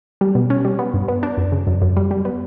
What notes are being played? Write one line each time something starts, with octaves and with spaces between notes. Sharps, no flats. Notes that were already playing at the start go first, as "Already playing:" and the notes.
G3
B2
C#4
G3
B3
G2
B3
D4
F#2
C#3
F#2
F#2
G3
G3
B3